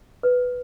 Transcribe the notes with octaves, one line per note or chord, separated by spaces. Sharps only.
B4